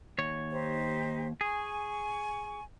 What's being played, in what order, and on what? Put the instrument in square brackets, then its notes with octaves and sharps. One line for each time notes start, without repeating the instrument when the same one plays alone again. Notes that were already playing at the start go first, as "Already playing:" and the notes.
[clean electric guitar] D#2 C#5
[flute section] D#4 G4 C5
[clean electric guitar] G#4 [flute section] G#5 C#6